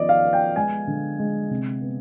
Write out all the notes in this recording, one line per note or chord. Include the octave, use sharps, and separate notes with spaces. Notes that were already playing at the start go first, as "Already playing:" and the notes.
Already playing: D#3 F3 B3 D5 D#5
F5
B3
G5
G#3 G#5
D3
G#3
C3
B3